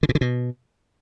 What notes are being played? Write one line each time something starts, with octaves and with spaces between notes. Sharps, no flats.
D3
A#2
D3
B2